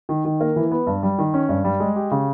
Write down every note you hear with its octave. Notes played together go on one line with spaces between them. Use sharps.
D#3
D#3
A#3
E3
B3
G2
G3
D#3
C#4
G2
G3
G#3
G4
C#3